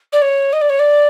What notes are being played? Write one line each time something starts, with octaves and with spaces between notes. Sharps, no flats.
D5
C#5
D#5
D5
C#5
D5